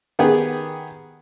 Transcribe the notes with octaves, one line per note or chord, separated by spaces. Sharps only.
D#3 B3 G4 G#4